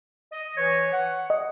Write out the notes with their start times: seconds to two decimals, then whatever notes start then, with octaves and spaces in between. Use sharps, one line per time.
0.32 D#5
0.57 E3 B4 C#5
0.92 F#5
1.30 D#5